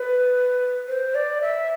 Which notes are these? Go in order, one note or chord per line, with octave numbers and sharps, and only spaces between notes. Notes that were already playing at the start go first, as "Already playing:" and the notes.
Already playing: B4
C5
D5
E5